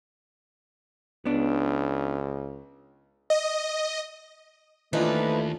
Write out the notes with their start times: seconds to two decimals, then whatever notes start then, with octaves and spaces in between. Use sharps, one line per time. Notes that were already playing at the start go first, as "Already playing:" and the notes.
1.25 C#2 B3 D4
3.30 D#5
4.93 D#2 E3 F3 A3 D4 D#4 F4 B4